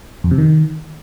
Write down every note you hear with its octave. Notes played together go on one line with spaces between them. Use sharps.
F2
C3
D#3